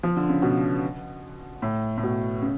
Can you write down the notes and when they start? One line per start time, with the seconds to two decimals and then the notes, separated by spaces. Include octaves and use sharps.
0.03 F3
0.17 D3
0.29 C#3
0.42 B2
1.62 A2
1.98 A2
2.03 B2
2.42 C#3